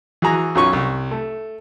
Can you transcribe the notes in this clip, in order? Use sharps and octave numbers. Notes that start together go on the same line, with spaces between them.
E3 F#4 G#4 A#5
B1 F#2 F#3 C#4 F4 C#6
C2
A3